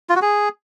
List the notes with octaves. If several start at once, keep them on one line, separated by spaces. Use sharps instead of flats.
F4
F#4
G#4